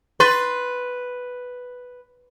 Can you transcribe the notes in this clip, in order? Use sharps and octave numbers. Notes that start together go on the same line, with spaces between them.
B4 C6 A6